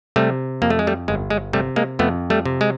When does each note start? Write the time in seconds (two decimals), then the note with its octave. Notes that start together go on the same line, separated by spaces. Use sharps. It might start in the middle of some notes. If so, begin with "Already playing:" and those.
0.16 C3 G3 A3
0.62 F2 A#3
0.70 A3
0.79 G#3
0.87 G3 A3
1.08 G1 G#3
1.30 G#3
1.53 C3 G3 A3
1.76 G#3 A#3
1.99 F2 A3 B3
2.30 G3 A3
2.46 C3
2.61 G#3